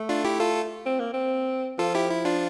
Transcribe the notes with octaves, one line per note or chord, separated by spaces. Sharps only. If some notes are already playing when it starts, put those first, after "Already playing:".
Already playing: A3
D4 F4
E4 G4
F4 A4
C4
A#3
C4
F3 F4 A4
E4 G4
E4
D4 F4